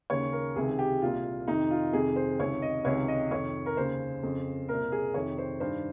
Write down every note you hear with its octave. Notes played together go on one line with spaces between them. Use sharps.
D#2 C#3 C#5
A#4
C#2 C3 D#3 G#4
G4
C2 A#2 F4
F2 C3 D#3 D#4
F4
F2 C3 D#3 G#4
C5
C#2 C3 D#3 C#5
D#5
C#2 C3 D#3 C#5
D#5
F2 C3 D#3 C#5
A#4
D#2 C#3 C5
F2 C#3
C2 A#2 A#4
G#4
F2 C3 D#3 C#5
C5
G2 D#3 C5